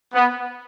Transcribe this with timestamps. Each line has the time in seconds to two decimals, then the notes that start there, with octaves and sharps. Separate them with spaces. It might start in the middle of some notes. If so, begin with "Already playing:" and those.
0.14 B3